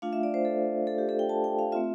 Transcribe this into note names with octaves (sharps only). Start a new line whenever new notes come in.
A3 D4 F4 F5
E5
D5
C5
A4
A4
G4
A4
G5
A5
G5
F5
A3 C4 F4 E5